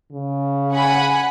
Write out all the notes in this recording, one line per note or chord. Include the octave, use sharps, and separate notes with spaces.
C#3
F#5 G#5 B5